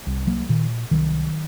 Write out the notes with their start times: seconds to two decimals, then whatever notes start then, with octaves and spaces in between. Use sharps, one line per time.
0.07 C2
0.27 F#3 A#3
0.49 A#2 D#3
0.91 C2 D#3 F#3